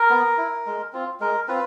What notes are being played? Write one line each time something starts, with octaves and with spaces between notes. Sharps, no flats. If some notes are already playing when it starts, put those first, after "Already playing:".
Already playing: A#4
B3
E4
G#3
C4 F4
G#3 A#4
C4 F4 B4